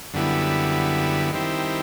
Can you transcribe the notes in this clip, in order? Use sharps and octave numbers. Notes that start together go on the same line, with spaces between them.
F#2 D3 G3 B3 E4
D#3 G3 C4 E4